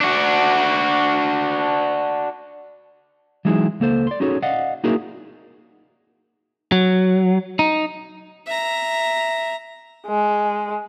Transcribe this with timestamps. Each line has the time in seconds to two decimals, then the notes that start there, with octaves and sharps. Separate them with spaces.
0.01 D4 F#4
3.45 E3 F#3 G#3 D#4 E4 G#4
3.80 C#2 A#3 A4 C5
4.07 D5 C6
4.20 C#4 D#4 F#4 G#4 A4 C#5
4.42 D5 D#5 F5 F#5
4.84 A#3 D#4 E4 F#4 G#4 A#4
6.72 F#3
7.59 D#4
8.47 E5 A#5
10.07 G#3